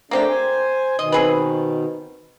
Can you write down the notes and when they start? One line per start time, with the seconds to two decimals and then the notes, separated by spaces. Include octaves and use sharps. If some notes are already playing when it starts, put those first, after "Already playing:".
0.11 A3 A#3 C4 D4 G4
0.29 C5 G#5
0.99 B2 D#3 D#5
1.12 C4 G#4 B4